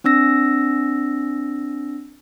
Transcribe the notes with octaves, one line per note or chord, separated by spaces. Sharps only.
C4 D4 E6 A#6